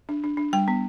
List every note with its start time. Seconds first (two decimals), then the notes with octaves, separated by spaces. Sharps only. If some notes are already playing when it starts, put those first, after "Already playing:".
0.09 D4
0.24 D4
0.37 D4
0.53 G3 G5
0.68 B3